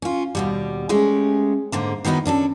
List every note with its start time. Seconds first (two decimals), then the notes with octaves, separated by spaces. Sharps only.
0.02 C#4 F4
0.35 D#2 B2 G3
0.89 G#3 A3 C#4 G4
1.72 G#2 D3 A#3
2.05 D#3 F#3 B3 D#4 E4
2.26 C#4 D4 G4 A4